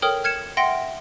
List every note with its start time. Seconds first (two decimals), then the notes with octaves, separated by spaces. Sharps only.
0.02 A4 A#4 C#5 G5 D#6 F6
0.24 F6 G#6 C#7 E7
0.57 E5 F#5 G5 C6 A#6 D7